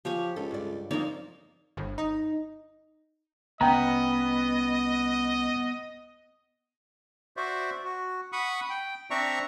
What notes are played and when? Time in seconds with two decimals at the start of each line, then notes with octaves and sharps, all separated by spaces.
0.05 F3 G4 C#5 G#5
0.36 C#2 A4
0.51 G2 D5
0.91 F3 A#3 C4 D#4 C#5 D5
1.77 G1
1.98 D#4
3.61 C2 F3 B3 C#4 D#5 G5 A#5
7.37 F#4 C5 D5 E5
7.84 F#4
8.32 F#5 B5 C#6 D#6
8.70 G5
9.10 C4 D4 D5 E5 A#5 C#6